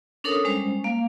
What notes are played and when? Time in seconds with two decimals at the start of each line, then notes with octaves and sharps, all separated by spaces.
0.24 C#4 D4 A4 A#4 C#5 D#6
0.45 G3 G#3 C#4 C5
0.84 A#3 F5